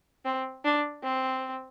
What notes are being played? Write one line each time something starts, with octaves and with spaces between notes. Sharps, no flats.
C4
D4
C4